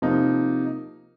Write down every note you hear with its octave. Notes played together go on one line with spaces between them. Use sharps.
C3 F3 A#3 D#4